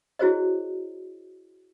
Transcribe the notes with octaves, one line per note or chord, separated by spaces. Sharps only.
E4 F#4 G#4 C5 C#5 D#5